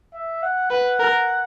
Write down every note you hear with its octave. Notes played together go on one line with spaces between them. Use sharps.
E5
F#5
B4 F#5
A#4